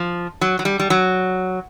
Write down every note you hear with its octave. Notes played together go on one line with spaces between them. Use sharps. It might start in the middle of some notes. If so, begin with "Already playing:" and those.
Already playing: F3
F#3
F#3
G3
G3
F#3